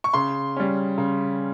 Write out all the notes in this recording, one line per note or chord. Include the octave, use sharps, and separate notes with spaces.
C#6
C#3 C6
G3 C#4
C#3